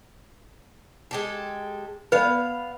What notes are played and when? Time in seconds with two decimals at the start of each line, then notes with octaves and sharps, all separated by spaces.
1.11 G#3 G4 A4
2.12 B3 B4 D5 F5